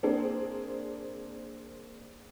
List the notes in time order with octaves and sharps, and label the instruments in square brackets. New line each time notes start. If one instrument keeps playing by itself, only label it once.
[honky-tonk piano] A#3 C4 D4 G#4